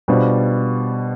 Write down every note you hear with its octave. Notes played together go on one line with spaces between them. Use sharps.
B2 G3 D4 F4 C5